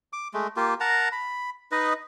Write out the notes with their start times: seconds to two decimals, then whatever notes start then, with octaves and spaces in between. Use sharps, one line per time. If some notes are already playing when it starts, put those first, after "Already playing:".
0.13 D6
0.34 G#3 A3
0.56 A#3 F4 G4
0.80 A#4 F#5 A5 A#5
1.12 B5
1.72 D#4 B4 D#5